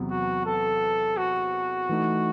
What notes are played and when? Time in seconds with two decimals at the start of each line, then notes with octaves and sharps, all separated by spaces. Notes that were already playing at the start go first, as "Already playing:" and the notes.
Already playing: E2 C3 F#3 B3
0.10 F#4
0.46 A4
1.17 F#4
1.89 E3 A3 D#4